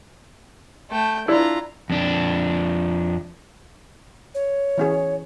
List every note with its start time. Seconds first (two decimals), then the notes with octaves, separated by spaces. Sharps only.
0.91 A3 G5
1.28 D4 E4 F4 A#5
1.90 F2 D4
4.35 C#5
4.78 E3 C#4 G#4